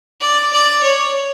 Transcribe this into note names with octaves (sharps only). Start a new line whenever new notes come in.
D5
D5
C#5